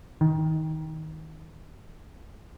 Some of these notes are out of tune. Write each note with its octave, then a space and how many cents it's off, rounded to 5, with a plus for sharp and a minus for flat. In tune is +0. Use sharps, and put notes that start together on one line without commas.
D#3 +20